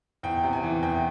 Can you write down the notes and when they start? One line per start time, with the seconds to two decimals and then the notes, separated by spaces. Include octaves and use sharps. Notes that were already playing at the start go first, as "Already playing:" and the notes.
0.23 E2 G5
0.43 C3
0.53 G#5
0.63 E3
0.82 E2 G5